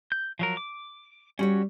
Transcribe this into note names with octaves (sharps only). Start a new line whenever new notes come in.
G6
F3 F#3 A#4
D6
G3 C#4 F#4 C#5